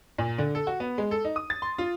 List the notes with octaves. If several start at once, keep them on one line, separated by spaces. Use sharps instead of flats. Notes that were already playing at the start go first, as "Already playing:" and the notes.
A#2
D3
A4
F#4
B3
G#3
A4
D#4
D#6
A6
C6
F4